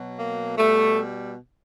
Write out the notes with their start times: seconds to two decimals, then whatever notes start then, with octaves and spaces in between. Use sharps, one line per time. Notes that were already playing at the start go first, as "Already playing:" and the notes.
Already playing: B2 F#3
0.19 A#3
0.57 B2 G3 A3